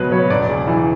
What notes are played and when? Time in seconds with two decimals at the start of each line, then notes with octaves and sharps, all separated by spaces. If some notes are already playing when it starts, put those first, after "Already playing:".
Already playing: C#2 B2 F#3 B4
0.12 F#3 C#5
0.30 E1 D5
0.49 C#3
0.68 E3